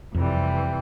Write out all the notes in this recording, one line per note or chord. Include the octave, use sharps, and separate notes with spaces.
F2 C3 E3 G3